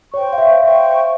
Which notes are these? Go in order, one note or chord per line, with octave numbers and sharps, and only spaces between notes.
C5 C#5 G5 C#6
F5
E5
C5 E5 G5 C#6